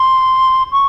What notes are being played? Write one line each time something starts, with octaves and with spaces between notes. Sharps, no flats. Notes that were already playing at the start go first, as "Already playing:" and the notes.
Already playing: C6
C#6